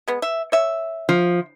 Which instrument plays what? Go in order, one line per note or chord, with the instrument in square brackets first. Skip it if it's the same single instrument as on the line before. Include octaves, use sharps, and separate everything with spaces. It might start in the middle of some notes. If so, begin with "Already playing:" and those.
[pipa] G#3 B3
E5
C#5 E5
[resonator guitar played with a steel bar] F3